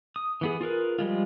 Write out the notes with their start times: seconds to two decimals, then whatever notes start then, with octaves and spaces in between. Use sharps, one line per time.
0.16 D#6
0.41 E3 B3 G#4
0.61 F4 G#4 A#4 B4
0.99 F3 G3 G#3 F4